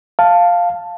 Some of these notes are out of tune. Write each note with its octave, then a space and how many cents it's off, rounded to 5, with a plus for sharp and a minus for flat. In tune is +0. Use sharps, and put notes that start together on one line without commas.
F5 +0 A5 +5